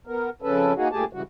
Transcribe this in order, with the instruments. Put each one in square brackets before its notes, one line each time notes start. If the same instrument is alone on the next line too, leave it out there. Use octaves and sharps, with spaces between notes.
[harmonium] B3 A#4
F2 C#3 C#4 A4 B4
A#3 D#4 F#4 G#4
G2 A#2 A3 G4 G#4 A5
G#2 C#3 E3 G3 F#4